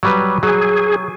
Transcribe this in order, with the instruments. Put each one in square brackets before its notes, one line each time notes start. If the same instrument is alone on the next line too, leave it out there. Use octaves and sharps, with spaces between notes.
[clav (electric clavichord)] F#3 G3 B4
[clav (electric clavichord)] F#3 [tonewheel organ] G#4